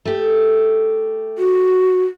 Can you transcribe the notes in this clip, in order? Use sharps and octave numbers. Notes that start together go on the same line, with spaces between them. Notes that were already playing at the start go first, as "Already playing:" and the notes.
A3 G4
F#4